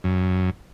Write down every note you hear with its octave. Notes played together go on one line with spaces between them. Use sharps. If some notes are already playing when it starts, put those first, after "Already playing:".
F#2